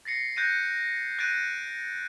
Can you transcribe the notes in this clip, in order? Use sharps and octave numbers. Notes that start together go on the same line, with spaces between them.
A6 A#6 C7 C#7
F#6 G6 A6 A#6 D7 D#7
F#6 G6 A6 D7 D#7